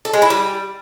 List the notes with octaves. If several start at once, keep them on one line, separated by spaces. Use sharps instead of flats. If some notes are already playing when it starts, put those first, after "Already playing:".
A4
G#3
E4
G3